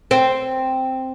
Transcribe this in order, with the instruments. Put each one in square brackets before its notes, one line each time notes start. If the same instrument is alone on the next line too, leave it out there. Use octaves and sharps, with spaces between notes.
[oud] C4